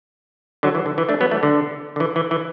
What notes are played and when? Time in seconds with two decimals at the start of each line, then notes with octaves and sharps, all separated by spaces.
0.63 D3 F#3
0.75 E3
0.86 D3
0.98 E3
1.09 A3 D4
1.20 F#3 B3
1.31 E3 A3
1.43 D3
1.96 D3
2.00 E3
2.16 E3
2.31 E3